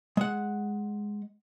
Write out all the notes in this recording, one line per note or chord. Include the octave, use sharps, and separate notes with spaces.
G#3 F#5